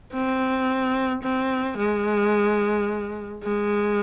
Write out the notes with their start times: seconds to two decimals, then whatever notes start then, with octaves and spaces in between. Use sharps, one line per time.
0.13 C4
1.23 C4
1.77 G#3
3.43 G#3